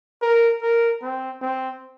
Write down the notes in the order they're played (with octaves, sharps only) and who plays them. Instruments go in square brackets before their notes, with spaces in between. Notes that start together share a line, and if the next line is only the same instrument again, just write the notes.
[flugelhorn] A#4
A#4
C4
C4